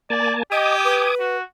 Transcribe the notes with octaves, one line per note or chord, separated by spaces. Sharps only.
A#3 D5 G#5 A5
G4 D#5 G#5 D6 D#6
B4
F#4